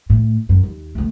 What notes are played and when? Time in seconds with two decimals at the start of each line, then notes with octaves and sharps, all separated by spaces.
0.10 A2
0.49 F#2
0.63 D#2
0.95 D2 A3